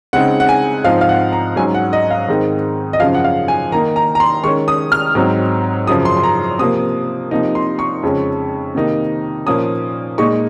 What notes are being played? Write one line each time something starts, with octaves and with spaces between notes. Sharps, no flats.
C#3 G#3 C4 D#4 F#5
F#5
G#5
G#2 F3 C4 D#4 F5
F5
F#5
A#5
G#2 F#3 C#4 G#5
F#5
D#5
F5
G#2 D#3 G#3 C4 D#4
D#5
F#2 C#3 F3 F5
F#5
F5
G#5
D#3 A#3 D#4 A#5
A#5
A#5
C6
D#3 G#3 C#4 C#6
D#6
F6
G#2 F#3 C4 D#4
F#2 C#3 F3 D#6
C6
C6
A#5
C3 F3 A#3 D#6
C3 F3 A#3 D#4
C6
C#6
F2 C#3 G#3 C#4
C3 D#3 A#3 D#4
A#2 F3 A#3 C#4 D#6
A#2 G#3 D#4 C#6